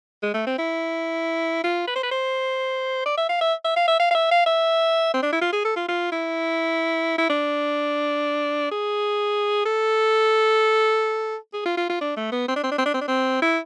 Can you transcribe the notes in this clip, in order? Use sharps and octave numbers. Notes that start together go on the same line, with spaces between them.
G#3
A3
C4
E4
F4
B4
C5
B4
C5
D5
E5
F5
E5
E5
F5
E5
F5
F5
E5
F5
E5
C4
D4
E4
F4
G#4
A4
F4
F4
E4
E4
D4
G#4
A4
G#4
F4
F4
F4
D4
A3
B3
C4
D4
C4
D4
C4
D4
C4
D4
C4
E4